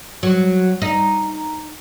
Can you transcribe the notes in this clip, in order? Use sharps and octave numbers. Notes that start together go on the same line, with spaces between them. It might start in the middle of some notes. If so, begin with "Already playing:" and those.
F#3
D#4